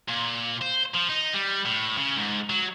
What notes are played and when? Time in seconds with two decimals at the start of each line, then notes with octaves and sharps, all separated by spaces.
0.08 A#2
0.62 C5
0.94 F3
1.09 D#4
1.34 G3
1.66 A2
1.97 C#3
2.16 G#2
2.50 F#3